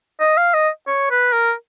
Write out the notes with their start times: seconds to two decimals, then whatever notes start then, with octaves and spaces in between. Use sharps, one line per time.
0.20 D#5
0.37 F5
0.54 D#5
0.88 C#5
1.11 B4
1.33 A#4